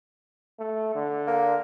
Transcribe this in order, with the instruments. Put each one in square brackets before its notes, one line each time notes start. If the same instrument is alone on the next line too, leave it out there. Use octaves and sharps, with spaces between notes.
[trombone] A3
D3
[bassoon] A#3